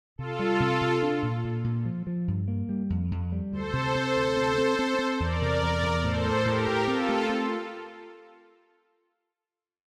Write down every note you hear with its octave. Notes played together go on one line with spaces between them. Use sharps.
C3 F4 A4
G3
C3
C3
D4
A#2
A#2
A#2
F3
F3
G2
A#3
G3
F2
F2
G3
D2 A4 C5
C3
C3
D2
C4
C4
C4
C4
E2 A#4 D5
C3
E2
E2
A2 A4 C5
A2
A2 G4 A#4
A2
C4 F4 A4
A3
C4